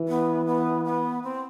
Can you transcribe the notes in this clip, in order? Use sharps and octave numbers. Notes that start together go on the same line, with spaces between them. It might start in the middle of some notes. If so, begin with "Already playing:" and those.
Already playing: E3
B3
B3
B3
C4